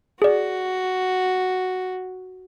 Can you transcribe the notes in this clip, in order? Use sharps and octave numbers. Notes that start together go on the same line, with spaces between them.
F#4 G#4 D5